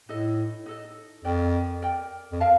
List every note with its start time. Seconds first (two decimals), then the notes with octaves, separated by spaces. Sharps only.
0.09 A2 D#4 A4 D#5
0.66 D#4 A4 D#5
1.24 F2 A#4 D5 G5
1.82 A#4 D5 G5
2.32 F2
2.40 A#4 F5 A5